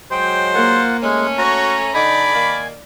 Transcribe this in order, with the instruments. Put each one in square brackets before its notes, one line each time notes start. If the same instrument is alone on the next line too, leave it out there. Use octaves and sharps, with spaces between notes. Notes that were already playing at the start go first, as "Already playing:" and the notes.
[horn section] F#3 G#3 [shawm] C5 [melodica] G5
[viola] A#3 [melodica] F4 F#5
[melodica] G#3 [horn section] A3 C#4
[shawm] F#4 [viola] C#5 [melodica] A#5
[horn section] D3 D#4 [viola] D5 [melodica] G#5 [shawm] B5
[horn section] D#3 A#3